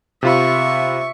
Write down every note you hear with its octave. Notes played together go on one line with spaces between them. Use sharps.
C3 F4 E5 B5 C#6